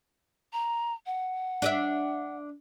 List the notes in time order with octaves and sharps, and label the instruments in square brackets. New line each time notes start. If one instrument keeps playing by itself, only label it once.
[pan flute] A#5
F#5
[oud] D4 D#5 E5